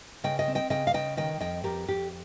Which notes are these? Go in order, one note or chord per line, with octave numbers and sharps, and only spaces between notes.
C#3 D#5 G5
D#5 G5
C4
D#5 G5
C#3 D#5 G5
F5
C#3 D#5 G5
D#3 D#5 G5
F2 D#5 G5
F2 G4 A#4
F2 G4